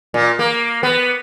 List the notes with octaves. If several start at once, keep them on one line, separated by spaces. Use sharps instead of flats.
A#2
A#3
B3